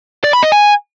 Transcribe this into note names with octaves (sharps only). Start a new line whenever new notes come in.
D5
B5
D#5
G#5